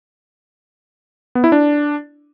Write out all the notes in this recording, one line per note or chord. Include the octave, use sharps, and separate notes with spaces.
B3
E4
D4